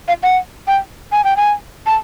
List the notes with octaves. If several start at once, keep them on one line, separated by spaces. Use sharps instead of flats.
F5
F#5
G5
G#5
G5
G#5
A5